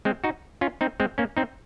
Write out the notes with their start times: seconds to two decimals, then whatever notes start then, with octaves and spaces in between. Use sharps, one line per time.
0.05 G#3 C4
0.24 D#4 F#4
0.61 C#4 F4
0.81 C4 D#4
1.00 G#3 C4
1.18 A#3 C#4
1.37 C4 D#4